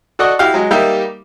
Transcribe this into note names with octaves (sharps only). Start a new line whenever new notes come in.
F#4 A4 D5 D#5 F#5 C#6
E4 F#4 G4 F5
F#3 G#3
G3 A#3 D#4 G4 E5